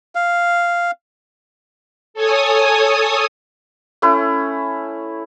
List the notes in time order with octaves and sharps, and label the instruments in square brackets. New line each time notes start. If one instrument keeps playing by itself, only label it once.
[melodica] F5
[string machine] A4 C#5 G#5 D#6
[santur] A3 C#4 E4